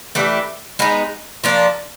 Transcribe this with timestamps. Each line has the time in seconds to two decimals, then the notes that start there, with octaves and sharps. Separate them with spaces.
0.15 E3 A3 D4 G4
0.79 G#3 B3 D#4
1.44 F3 A#3 D4